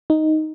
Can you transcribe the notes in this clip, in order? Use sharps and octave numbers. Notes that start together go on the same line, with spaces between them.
D#4